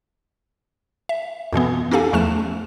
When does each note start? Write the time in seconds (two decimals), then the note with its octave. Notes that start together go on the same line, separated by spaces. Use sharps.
1.09 E5
1.53 F2 B2 E3 B3
1.91 C#4 D#4 G4 A4 F5 G#5
2.13 E2 F3 A3 F6 E7